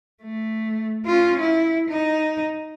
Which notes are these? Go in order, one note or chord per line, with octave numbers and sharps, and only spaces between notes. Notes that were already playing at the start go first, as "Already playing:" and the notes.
A3
C#4 F4
E4
D#4